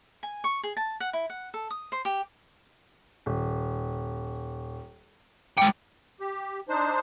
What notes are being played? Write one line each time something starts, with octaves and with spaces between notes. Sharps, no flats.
G#5
C#6
G#4
A5
F#5
E4
F#5
A4
D#6
C5
G4
D#1
G#3 G5 D6 C#7
G4
D4 D#4 C5